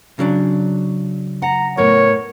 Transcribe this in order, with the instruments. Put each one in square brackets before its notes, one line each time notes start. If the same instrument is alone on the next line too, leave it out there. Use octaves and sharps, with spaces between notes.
[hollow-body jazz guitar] C#3 F#3 D4
[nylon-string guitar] F#5 [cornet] A#5
[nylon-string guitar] A2 B3 A#4 [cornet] C#5